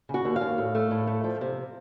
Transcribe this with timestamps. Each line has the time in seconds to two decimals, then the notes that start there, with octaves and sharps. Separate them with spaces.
0.09 C#3
0.14 F#4
0.25 D#2
0.36 F5
0.41 D#2
0.58 A2
0.75 A3
0.91 A2
1.07 A3
1.24 F3
1.41 C3